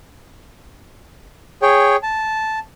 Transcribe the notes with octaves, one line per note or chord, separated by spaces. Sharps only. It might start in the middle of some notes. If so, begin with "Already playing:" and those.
G#4 C#5 G5
A5